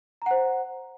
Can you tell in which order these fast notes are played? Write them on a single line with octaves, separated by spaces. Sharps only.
A#5 F#5 C5